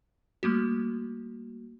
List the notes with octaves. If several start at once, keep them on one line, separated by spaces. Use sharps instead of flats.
G3 A3 A#3 F#4